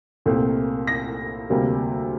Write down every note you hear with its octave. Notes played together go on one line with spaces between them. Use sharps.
C2 A#2 A3 C4
A#6
D2 C3 G3 A#3